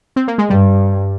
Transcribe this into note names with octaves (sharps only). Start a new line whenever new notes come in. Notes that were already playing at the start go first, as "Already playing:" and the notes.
C4
A#3
G#3
G2 G3